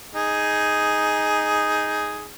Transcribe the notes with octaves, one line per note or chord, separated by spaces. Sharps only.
D#4 G#4